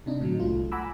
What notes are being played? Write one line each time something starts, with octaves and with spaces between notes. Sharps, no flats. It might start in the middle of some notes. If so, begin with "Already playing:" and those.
C3 D4 D#4
A2 D3 F#3
C2 A3 F4
F#5 G#5 A#5 B5 D6 E6